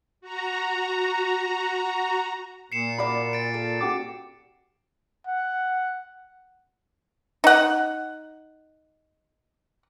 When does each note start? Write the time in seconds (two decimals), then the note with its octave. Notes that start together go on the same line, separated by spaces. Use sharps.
0.21 F#4 A#5
2.72 A#2 C7 C#7 E7
2.98 F#4 D5 B5
3.33 A6 D7
3.54 A4
3.81 F#4 G4 D6
5.27 F#5
7.44 D#4 F#5